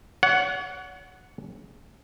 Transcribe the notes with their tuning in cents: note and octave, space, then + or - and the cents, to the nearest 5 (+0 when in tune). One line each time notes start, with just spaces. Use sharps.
C#5 +40 F#5 +0